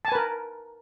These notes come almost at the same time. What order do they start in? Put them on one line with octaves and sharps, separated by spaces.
A5 G#5 B4 A#4